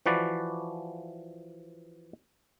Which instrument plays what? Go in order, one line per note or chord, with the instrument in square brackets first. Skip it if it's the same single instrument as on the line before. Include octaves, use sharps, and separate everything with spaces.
[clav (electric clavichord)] E3 F3 F#4 B4 D5